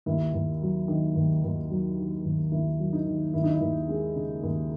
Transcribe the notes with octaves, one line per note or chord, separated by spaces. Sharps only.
D#2 E4
D#2
F#3
D#3
D#2
D#2
F#3
D#3
D#2
D#2 E4
F#3
D#4
D#3
D#2 E4
D#4
E4
D#2
G#3
C#3
D#2